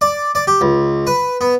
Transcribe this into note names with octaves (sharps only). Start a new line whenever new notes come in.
D5
D5
G4
C#2
B4
B3